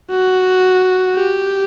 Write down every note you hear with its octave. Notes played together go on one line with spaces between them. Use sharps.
F#4
G4